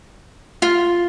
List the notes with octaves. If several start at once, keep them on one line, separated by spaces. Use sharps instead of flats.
F4